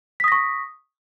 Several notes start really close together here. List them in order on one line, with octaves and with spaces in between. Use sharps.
B6 D#6 A#6 C#6